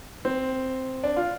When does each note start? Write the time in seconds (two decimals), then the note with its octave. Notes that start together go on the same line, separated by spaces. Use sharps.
0.25 C4
1.03 D4
1.16 F4